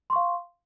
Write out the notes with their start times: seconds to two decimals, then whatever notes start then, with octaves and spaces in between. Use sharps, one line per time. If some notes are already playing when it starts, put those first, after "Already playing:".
0.10 C6
0.13 C#6
0.16 F5